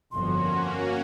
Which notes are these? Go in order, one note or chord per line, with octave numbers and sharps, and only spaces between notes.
G1 F2 F3 A#3 C#4 F#4 C6